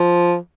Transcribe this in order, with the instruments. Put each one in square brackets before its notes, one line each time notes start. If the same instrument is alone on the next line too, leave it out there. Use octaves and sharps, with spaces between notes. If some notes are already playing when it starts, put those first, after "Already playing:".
Already playing: [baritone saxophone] F3